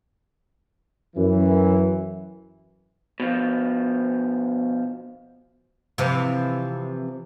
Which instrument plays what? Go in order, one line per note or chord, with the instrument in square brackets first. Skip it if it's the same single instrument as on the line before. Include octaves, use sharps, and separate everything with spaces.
[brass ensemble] F#2 E3
[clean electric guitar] B2 F3
[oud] C3 E3 F3